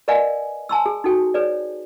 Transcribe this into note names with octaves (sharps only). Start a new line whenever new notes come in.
A#4 B4 D5 D#5 F5 G#5
G#5 A5 C6 E6
G#4
D#4 F#4 A4 G5
G#4 B4 C#5 D5